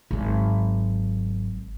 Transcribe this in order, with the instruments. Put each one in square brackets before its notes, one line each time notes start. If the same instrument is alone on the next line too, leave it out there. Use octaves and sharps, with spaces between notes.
[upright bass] G#1 F#3